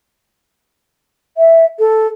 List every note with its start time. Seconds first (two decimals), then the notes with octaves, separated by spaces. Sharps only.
1.37 E5
1.79 A4